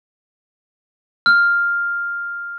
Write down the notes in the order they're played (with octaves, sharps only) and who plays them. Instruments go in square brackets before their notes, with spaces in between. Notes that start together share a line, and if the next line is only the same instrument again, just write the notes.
[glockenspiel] F6